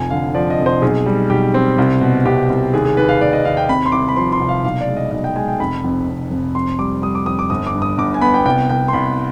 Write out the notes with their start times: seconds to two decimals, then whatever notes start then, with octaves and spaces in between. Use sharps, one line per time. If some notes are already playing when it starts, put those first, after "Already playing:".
Already playing: F1 F3 G#5
0.10 D3 F5
0.34 F3 D5
0.50 D#5
0.59 F1
0.66 C5
0.82 B1 G#4
1.06 G3
1.30 B1 G4
1.54 C4
1.78 C2
2.01 B2
2.25 C2 G4
2.50 C2
2.73 D#2 G#4
2.85 G#4
2.97 D#2 B4
3.09 F5
3.21 D#2 D5
3.33 D#5
3.45 D#2 F5
3.57 G5
3.69 C3 B5
3.86 C6
3.92 C2 D6
4.09 B5
4.16 F3 C6
4.32 C6
4.40 C2
4.49 F5
4.64 B1 F5
4.81 D5
4.87 G#3
4.97 D#5
5.11 B1 D#5
5.24 G5
5.36 G#3 G#5
5.48 G5
5.59 F1 B5
5.84 F2
6.08 F1
6.31 F1
6.55 F2 C6
6.79 G3 D6
7.02 G3 D#6
7.15 D6
7.26 F2 D#6
7.39 D6
7.50 G1 D#6
7.66 D6
7.74 G2
7.82 D#6
7.98 G1 D6
8.14 G#5
8.21 B3 B5
8.34 G5
8.46 C2 G5
8.69 C2 G5
8.88 C6
8.93 C2 B5